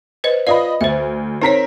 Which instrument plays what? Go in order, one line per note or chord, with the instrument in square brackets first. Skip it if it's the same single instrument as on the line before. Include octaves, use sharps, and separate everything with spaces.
[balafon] B4 C5 D#5
[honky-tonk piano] F4 D#5 B5 [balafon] B4 D5
[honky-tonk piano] D2 [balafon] C5 E5
[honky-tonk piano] C4 A#4 B6 [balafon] D#4 C#5